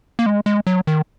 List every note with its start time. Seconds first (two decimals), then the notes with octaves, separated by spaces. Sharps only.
0.19 A#3
0.26 G#3
0.46 G#3
0.67 F#3
0.87 D#3